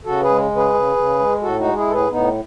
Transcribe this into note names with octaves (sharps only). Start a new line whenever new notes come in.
C#3 F#4 A4
G#4 B4
G#3
C#3
G#4 B4
C#3
C#3
G#3
A2 F#4 A4
D#4 F#4
G#3
E4 G#4
A2 A4
G#4 B4
A2 B3 D#4